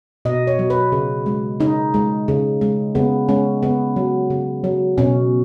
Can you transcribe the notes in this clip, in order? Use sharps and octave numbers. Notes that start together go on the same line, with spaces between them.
B2 D#5
C#5
F#3
B4
C#3
G#3
C#3 D#4
G#3
C#3
G#3
C#3 B3
G#3 C#4
C#3 B3
F#3
C#3
F#3
B2 C#4